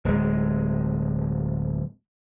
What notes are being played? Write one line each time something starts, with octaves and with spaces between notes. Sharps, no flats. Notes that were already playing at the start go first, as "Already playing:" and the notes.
D1 G#3